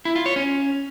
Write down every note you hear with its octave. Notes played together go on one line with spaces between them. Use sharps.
E4
F4
C#5
C#4